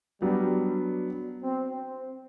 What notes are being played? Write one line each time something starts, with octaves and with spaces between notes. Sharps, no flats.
F#3 G3 B3 D4
C4
C4